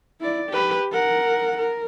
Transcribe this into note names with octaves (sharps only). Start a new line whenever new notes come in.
E4 D5
G4 B4
A#4 F#5
A#4